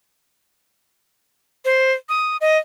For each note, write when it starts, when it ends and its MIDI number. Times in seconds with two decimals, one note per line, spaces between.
1.65 1.93 72
2.09 2.37 87
2.41 2.58 75